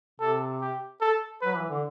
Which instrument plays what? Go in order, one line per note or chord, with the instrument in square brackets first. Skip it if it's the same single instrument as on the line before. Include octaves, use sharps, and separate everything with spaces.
[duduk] C3 [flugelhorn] A4
[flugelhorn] G4
A4
[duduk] F#3 [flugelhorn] B4
[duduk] E3
D3